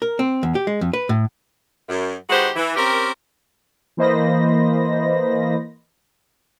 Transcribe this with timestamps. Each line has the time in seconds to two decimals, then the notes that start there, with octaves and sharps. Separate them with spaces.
0.02 A#4
0.19 C4
0.43 E2
0.55 G4
0.67 G#3
0.81 F2
0.93 B4
1.09 A2
1.89 F#2
2.30 D#3 G#3 F#4 G4 B4 C5
2.56 E3
2.76 C4 C#4 G4 A#4
3.97 E3 A#3 C5 D#5 B5 A#6